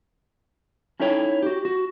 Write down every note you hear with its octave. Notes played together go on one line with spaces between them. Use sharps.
C#4 D#4 E4 A4 C#5 G5
F#4 G4
F#4